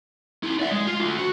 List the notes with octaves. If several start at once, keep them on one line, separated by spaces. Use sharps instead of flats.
E4 G4
D5 E5
G#3
F4
A3 D4
F#4